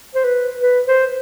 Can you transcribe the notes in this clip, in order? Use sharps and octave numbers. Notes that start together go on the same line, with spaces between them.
C5
B4
B4
C5